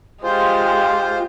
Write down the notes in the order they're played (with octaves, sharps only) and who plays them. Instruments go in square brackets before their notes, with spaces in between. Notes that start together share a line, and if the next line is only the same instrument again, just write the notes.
[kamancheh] G#3 G4 [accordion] F4 C5